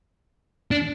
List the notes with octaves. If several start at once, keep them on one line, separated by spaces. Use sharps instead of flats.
D4